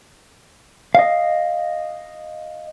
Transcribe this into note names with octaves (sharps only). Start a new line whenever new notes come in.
D#5 F5